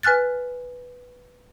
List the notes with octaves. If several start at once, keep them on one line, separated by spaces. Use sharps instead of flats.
B4 G#5 F6 F#6 A6